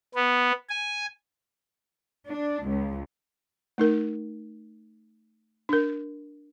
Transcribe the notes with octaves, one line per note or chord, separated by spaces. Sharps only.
B3
G#5
D4
C#2
A3 D#4 A#4
D4 A#4